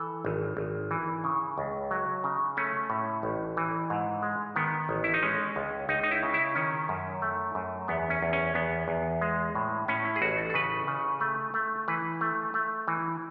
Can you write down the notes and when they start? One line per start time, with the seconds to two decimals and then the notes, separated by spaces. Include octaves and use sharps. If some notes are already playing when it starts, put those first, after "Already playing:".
Already playing: E3 A4
0.25 G#1
0.57 G#1
0.91 E3
1.24 C#3
1.58 C#2
1.91 F#3
2.24 C#3
2.57 A3 C#4
2.90 A2
3.23 A1
3.57 E3
3.90 G#2
4.22 G#3
4.56 D#3 B3
4.89 A1
5.04 E4
5.14 D#4
5.23 G#3 C#4
5.56 C#2
5.89 C#2 D#4
6.03 D#4
6.11 E4
6.23 C#3
6.34 E4
6.55 D#3 C#4
6.89 F#2
7.22 A3
7.55 F#2
7.88 E2 B3
8.10 C#4
8.22 E2
8.33 C#4
8.55 E2 B3
8.88 E2
9.22 G#3
9.55 A2
9.88 A2 C#4
10.05 E4
10.16 G#4
10.22 A1 F#4
10.38 A4
10.50 A4
10.54 C#3 B4
10.87 C#3
11.20 A3
11.54 A3
11.88 E3 B4
12.21 A3
12.54 A3
12.88 E3